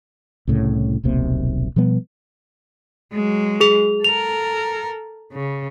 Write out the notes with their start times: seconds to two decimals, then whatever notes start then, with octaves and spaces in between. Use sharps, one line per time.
0.47 C2 A2 C#3
1.04 D#1 B1 C3 A#3
1.76 B2 F3 G3 B3
3.13 F#3 G#3
3.61 G#4 F7
4.04 A4 A#4 F7
5.33 C#3